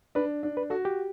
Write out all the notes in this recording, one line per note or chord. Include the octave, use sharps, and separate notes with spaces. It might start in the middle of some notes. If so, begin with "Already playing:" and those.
D4 B4
D4
B4
F#4 A4
G4